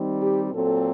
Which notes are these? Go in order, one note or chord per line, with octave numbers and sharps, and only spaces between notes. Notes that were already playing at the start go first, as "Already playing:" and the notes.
Already playing: D#3 G3 C4 D#4
G4
A#2 F#3 C4 A4